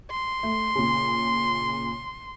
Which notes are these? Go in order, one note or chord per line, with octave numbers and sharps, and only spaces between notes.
C6
A3
A#2 C#3